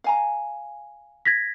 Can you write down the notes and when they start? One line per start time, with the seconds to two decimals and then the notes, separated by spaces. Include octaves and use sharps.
0.04 F5 G#5 A#5
1.25 G#6 A#6 B6